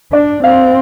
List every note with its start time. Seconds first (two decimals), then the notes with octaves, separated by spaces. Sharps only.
0.12 D4 D5
0.44 C4 F5